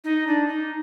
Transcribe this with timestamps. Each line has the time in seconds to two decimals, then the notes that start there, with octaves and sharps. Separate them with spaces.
0.04 D#4
0.27 D4
0.48 D#4